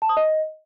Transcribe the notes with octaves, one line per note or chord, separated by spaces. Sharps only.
A5
D#6
D#5